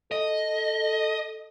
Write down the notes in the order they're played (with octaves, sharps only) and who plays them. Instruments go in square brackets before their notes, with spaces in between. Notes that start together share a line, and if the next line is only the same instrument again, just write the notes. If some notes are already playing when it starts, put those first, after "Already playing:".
[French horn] A4 [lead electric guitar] D#5